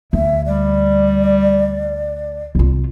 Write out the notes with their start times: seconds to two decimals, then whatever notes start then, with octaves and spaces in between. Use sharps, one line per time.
0.13 D2 E5
0.46 G3 D5
2.55 C2 F4